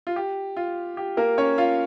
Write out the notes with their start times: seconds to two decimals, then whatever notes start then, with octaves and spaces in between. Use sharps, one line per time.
0.07 F4
0.16 G4
0.57 F4
0.97 G4
1.17 A#3 A#4
1.38 C#4 C#5
1.58 F4 F5